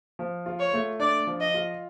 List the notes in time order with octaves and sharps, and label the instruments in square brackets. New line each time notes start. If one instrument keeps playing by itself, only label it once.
[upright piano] F3
F4
[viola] C#5
[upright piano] A3
[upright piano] D4 [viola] D5
[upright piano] F3
[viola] D#5
[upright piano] F4